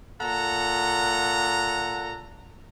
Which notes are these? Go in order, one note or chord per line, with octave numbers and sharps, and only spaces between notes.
A#2 A4 F#5 A#5